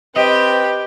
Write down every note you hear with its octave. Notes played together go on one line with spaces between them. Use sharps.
C4 G4 B4 D#5